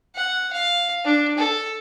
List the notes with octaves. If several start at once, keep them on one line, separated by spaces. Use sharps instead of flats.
F#5
F5
D4
A4